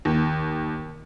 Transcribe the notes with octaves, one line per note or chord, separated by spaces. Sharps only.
D#2